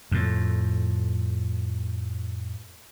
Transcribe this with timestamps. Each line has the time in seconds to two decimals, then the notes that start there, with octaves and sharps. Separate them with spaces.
0.12 F2 A2